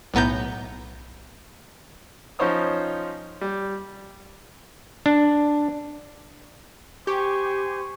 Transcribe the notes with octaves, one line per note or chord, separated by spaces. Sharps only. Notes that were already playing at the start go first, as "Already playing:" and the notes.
B1 A2 B3 A#5 G6
F3 C#4 D#4 C5 C#5 D#6
G3
D4
G4 C5 G#5 C#6